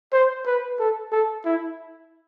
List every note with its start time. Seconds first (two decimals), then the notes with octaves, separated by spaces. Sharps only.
0.12 C5
0.46 B4
0.79 A4
1.12 A4
1.45 E4